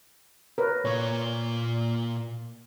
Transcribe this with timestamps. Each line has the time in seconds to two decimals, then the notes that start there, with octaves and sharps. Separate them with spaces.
0.58 A#4 B4 C#5
0.85 A#2 F4 C#5